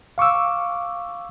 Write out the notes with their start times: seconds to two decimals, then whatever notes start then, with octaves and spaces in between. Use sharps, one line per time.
0.18 F5 C#6 D6 E6